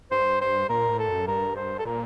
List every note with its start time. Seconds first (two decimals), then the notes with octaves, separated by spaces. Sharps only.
0.11 G2 C5
0.41 C5
0.69 A#2 A#4
0.89 A2
0.99 A4
1.08 F#2
1.28 G2 A#4
1.56 C5
1.79 A4
1.85 A#2 A#4